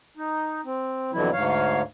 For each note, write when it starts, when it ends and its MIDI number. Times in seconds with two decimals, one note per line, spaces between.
0.17 0.61 63
0.65 1.11 60
1.13 1.30 41
1.13 1.30 47
1.13 1.30 50
1.13 1.30 52
1.13 1.30 54
1.13 1.30 64
1.32 1.82 38
1.32 1.82 44
1.32 1.82 73
1.32 1.82 77